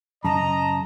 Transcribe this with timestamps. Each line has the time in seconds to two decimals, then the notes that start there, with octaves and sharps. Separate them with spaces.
0.25 F#2 C#3 D#5 A5 A#5